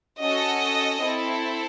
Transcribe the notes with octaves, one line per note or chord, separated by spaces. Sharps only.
C#4 F#4 A4 D#5
C4 E4 A4